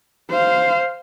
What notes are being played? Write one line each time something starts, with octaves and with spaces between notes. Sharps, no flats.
C5 F5